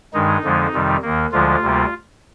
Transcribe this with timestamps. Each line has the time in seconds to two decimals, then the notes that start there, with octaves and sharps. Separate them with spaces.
0.14 G2 D#3 G#3 D#4
0.44 F2 D3 F3 G#3
0.73 F2 C3 D#3 G3
1.02 D#2 D#3 A#3
1.32 D2 D3 F3 G#3 F4
1.62 D2 C3 G3 A#3